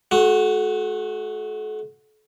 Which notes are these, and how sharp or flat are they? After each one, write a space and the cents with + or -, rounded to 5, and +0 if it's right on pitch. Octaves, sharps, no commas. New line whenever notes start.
A3 -35 F#4 +0